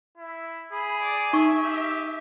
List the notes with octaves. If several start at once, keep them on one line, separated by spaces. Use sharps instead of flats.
E4
G#4 B5
D5
D#4 E5 C#6
G4